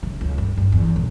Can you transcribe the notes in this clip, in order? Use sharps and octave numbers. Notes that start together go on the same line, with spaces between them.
C#3
C#2
G2
G2
E2
E1